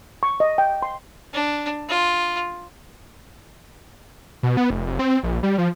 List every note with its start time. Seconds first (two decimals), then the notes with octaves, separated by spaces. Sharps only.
0.23 C#6
0.40 D#5
0.58 G5
0.82 C6
1.33 D4
1.89 F4
4.43 B2
4.57 B3
4.70 F1
4.87 F1
4.99 C4
5.23 A#1
5.43 G3
5.58 F3